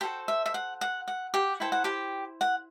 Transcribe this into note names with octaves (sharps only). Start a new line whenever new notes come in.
F#4 G4 A4 C5 G5
E5
E5
F#5
F#5
F#5
G4 G5
E4 A4 C5 G5
F#5
G4 G5
F#5